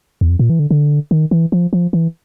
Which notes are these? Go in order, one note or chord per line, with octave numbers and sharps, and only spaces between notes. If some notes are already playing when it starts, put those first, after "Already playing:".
E2
F2
A#2
E3
D3
D3
D#3
E3
F3
F3
E3